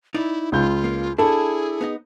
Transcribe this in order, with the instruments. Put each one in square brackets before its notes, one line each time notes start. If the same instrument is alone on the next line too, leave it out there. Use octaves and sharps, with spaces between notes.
[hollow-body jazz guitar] D#4 D5 [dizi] E4
[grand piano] C#2 G6 [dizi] F4
[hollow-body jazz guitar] A#3
[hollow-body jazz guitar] D4 E4 [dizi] G#4 [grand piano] A4
[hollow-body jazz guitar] B3 D#4 D#5